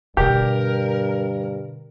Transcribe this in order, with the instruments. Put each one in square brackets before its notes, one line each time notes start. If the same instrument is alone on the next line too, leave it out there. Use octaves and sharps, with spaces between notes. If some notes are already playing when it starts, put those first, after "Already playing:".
[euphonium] G2 [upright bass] B2 D3 [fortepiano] G4 [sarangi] A#4